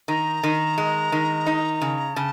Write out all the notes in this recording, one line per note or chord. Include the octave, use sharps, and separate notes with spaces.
D#3 A#5
D#3
G#3
D#3
D#4
C#3
C#3 A5